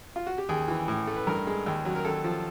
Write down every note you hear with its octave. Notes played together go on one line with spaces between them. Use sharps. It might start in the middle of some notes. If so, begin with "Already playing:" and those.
F4
F#4
G4
D#2 G#4
E3
A2
A3
B4
G2 A#4
G#3
D#2
F#3
A#4
D#2 A4
F3